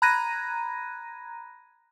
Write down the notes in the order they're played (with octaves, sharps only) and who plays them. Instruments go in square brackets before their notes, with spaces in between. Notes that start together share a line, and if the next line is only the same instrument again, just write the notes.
[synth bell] A#5 B5 F#6 G#6 A#6 D#7